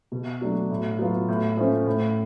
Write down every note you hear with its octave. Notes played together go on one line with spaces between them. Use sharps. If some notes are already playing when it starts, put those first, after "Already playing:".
B2
F#3 A3 D4
A2
F#3 B3 F4
A2
F3 A3 C#4
A2